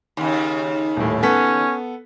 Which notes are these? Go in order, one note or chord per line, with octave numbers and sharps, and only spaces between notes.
D#2 C#3
D#1 A2
B3 C#4 A4 B6